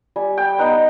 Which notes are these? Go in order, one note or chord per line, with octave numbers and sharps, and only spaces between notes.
G3 G#5
G5
B3 D#4 F#5